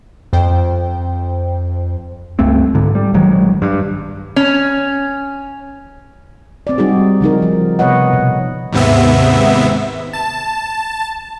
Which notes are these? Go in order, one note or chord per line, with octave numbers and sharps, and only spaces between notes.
F2 C5 G5
C#2 G2 A3 C4
G#2 D3
G3
A#1 D#3 F#3 G#3
G2
C#4
C4 D5
G3 D#4 F#4 G#4
C#3 F3 D#4 A#4
F3
C3 B3 B4 C#5 D#5 F#5
B2
D#2 G#2 C3 B3 E5
A5